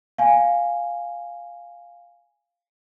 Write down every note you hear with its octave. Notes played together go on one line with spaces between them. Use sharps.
F5 G#5